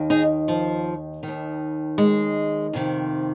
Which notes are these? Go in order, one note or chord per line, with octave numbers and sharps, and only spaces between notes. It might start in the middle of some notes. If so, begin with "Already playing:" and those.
Already playing: D#2 D#3
D#4 G#4
F3
D#2 D#3
G#3
F2 C3 D#3